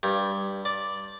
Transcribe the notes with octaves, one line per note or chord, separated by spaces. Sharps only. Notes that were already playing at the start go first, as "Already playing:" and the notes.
G2
D5